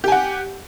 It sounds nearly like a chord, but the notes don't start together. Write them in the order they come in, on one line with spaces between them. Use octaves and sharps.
G4 G#5 F#5